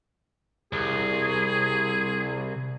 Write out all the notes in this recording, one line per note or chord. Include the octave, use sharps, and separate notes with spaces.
C2 G#4